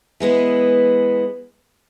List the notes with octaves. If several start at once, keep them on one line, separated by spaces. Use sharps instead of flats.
E3 G#3 B3 E4